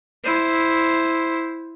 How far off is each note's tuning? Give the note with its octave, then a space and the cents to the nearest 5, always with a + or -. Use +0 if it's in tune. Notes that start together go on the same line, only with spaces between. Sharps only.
E4 +0 C5 +0